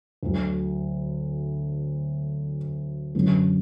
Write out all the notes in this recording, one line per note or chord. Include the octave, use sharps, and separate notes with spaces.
D2 D3 F#3
F#2 D3 F#3 B3